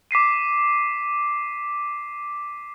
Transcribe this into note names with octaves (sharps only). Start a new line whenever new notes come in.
D6 B6 C7 D#7